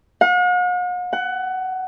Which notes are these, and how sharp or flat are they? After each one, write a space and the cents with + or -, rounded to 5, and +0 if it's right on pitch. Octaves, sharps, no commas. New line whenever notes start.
F#5 -45
F#5 +20